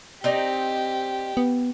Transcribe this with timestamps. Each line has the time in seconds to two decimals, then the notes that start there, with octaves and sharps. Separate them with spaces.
0.24 C4 D#4 G4 D5
1.37 B3